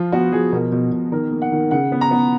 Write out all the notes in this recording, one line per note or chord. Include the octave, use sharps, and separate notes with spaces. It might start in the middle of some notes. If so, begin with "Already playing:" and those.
Already playing: F3 F4
B3 F#4
F3 G#4
B2 A#4
B2
B2
D#3 A#4
A#3
F#5
D#3
C#3 F#5
B3
A#5
B3